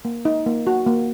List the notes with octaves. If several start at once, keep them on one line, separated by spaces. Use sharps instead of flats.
A#3
D#4
A#3
F#4
A#3